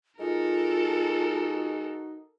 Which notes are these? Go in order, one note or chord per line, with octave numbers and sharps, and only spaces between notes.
G#3 D#4 F4 F#4 A4 A#4